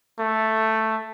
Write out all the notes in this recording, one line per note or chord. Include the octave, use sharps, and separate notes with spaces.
A3